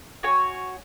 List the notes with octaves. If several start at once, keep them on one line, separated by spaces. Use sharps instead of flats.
F#4 C#5 G#5